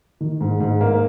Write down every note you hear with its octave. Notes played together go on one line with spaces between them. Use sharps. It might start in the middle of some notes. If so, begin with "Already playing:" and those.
D#3
G#2
G#2
A#3